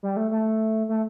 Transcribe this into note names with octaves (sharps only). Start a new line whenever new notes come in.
G3
A3
A3
A3